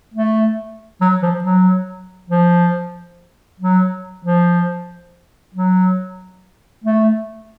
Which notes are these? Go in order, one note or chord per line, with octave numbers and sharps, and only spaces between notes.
A3
F#3
F3
F#3
F3
F#3
F3
F#3
A3